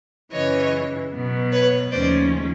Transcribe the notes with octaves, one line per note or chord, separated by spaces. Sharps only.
F#2 C#3 E3 C#5 D#5
B2 F#3 B3
B4 C#5
D#2 C#3 F3 A3 C#4 C5 D5